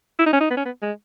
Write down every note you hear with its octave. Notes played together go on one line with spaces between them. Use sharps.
E4
D#4
C#4
D#4
B3
C#4
B3
G#3